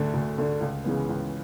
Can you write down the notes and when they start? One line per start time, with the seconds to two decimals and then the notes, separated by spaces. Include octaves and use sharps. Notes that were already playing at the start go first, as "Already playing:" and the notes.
Already playing: D2 D3 A3 D4
0.14 D2
0.38 D3 A3 D4
0.61 C#2
0.84 C#3 E3 G#3 B3
1.09 C#2